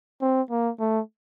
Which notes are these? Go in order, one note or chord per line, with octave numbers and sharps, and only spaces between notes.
C4
A#3
A3